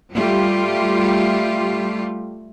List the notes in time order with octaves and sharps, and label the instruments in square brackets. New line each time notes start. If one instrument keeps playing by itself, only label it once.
[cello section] G3 A3 F4 G4